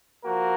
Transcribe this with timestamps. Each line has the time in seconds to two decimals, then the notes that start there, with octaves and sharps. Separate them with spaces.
0.24 F3 A#3 F#4 A#4